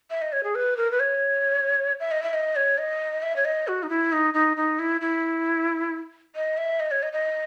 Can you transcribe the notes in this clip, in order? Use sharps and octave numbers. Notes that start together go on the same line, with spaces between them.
E5
D#5
C#5
G#4
B4
A#4
B4
C#5
E5
D#5
E5
D#5
C#5
D#5
E5
C#5
D#5
F#4
D#4
E4
D#4
D#4
D#4
E4
E4
D#5
E5
D#5
C#5
D#5
D#5